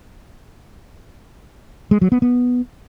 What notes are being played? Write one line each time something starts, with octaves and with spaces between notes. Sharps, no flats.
G#3
F#3
B3
B3